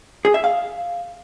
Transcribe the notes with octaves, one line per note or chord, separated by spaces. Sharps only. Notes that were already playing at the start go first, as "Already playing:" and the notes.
G#4
E5
F5